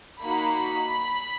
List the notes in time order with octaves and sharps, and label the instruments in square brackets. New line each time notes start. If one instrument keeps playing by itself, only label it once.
[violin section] A#3 D#4 F#4 B5